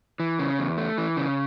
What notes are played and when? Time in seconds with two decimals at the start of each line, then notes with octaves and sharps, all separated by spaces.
0.20 E3
0.39 C#3
0.59 E2
0.77 A3
0.98 E3
1.17 C#3